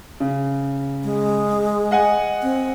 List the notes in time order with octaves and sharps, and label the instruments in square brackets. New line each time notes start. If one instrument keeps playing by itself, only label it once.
[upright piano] C#3
[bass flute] G#3
[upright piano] D#5 F#5 G#5
[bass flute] C4